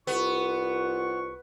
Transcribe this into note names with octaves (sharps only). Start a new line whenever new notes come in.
C2 B3 F4 C#6